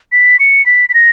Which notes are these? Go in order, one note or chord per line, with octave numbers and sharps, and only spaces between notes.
B6
C#7
B6
B6
A#6